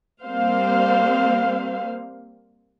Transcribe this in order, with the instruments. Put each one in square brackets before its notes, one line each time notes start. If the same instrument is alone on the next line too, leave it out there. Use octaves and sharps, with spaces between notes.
[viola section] G3 A#3 C4 C5 F5